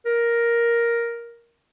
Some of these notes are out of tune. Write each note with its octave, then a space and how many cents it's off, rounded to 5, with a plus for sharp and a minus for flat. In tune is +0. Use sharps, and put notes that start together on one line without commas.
A#4 +5